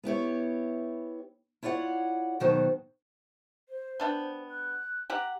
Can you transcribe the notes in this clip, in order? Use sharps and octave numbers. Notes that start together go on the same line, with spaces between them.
B3 E4 G4 C#5
E4 F4 C#5 D5 F#5
D#2 B2 D#3 F#3 F#4 C5
C5
B3 D4 G5
F#6
G4 F#5 A#5